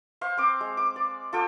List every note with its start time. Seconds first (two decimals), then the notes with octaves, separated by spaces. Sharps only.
0.21 C5 F5 C#6
0.37 C4 D6
0.61 G#3
0.77 D6
0.96 D5
1.33 F4 A4 G5 D#6